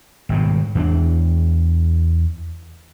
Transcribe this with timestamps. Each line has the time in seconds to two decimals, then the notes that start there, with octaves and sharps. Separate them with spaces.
0.29 G#1 G2 B2
0.75 E2 E3 A#3 D4